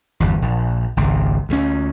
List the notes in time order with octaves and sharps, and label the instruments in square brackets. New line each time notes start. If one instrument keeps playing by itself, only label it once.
[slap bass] G1 E2
A#1
G#1 C#2
D2 D#3 C#4